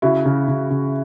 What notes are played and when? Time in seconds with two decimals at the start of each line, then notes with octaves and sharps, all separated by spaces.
0.02 C#3 E4 F#4
0.25 C#3
0.48 C#3
0.70 C#3